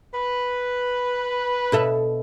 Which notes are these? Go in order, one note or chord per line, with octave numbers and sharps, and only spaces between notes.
B4
B2 A4 E5